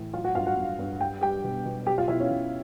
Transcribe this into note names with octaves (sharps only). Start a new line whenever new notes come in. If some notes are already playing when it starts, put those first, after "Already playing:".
Already playing: A2 E3
F#3 F4 F5
F#4 F#5
G2 F4 F5
F#4 F#5
G2
G2
G3 G5
G3 G4 G5
B2
B2
F#3 G4 G5
F4 F5
B2 E4 E5
C#4 C#5
B2